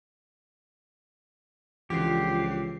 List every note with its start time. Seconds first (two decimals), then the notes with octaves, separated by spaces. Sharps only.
1.90 C#2 D3 E3 F3 G4 C7